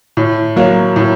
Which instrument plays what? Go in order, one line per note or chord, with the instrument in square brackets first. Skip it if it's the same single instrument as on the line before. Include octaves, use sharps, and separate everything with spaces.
[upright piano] A2
F#3 A#3
A2